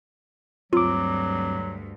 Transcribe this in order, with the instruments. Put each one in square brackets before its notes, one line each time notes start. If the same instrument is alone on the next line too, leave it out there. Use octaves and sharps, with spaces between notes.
[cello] D2 G2 [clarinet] F#3 [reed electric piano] C4 D6 [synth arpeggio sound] F4